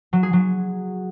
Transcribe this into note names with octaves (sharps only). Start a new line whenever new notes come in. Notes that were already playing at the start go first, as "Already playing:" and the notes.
F#3
G#4
F#3